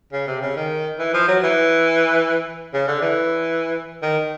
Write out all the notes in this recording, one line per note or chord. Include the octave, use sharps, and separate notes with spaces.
C#3
C3
C#3
D#3
E3
F3
F#3
E3
C#3
D3
E3
D#3